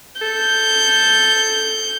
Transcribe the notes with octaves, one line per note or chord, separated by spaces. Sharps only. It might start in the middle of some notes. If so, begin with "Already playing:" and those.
A4 G6